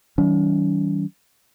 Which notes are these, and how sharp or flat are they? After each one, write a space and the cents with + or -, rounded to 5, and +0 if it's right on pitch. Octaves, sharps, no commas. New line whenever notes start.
D#3 +45 G3 -40 C#4 +45